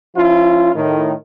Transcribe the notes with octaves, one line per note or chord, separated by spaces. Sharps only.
F3 C#4 E4 F4
A2 D#3